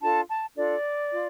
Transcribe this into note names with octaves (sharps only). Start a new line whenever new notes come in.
D4 F4 A4 A5
A5
D4 F4 A4 D5
F4